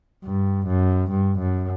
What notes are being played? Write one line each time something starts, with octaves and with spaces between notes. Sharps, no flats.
G2
F#2
G2
F#2